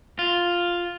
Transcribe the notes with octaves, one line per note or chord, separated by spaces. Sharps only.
F4